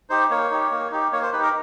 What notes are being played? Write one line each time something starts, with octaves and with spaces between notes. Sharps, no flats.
D#4 G4 C5
A#3 C#5
D#4 G4
A#3
D#4 G4
A#3 C#5
C5
D#4 G4 B4
A#4